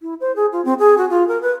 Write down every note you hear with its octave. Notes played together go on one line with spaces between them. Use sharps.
E4
C5
G#4
F4
C4
G#4
F#4
F4
A#4
B4